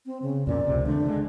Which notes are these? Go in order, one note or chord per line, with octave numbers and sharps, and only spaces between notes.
C4
C#3
F2 A#2 C#4 D5
C#2 C3
D3 E3 A3 D4
D3 G#3